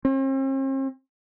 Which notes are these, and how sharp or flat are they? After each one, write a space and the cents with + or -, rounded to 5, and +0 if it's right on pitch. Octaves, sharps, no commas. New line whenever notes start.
C4 +45